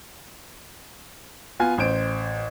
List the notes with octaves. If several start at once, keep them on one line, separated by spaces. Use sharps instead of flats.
B3 F4 G#5
A1 C5 D7